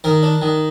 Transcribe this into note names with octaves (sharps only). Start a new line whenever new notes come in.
D#3 A#4
D4
D#3